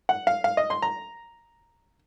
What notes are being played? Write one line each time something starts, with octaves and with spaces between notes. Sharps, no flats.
F#5
F5
F5
D#5
C6
A#5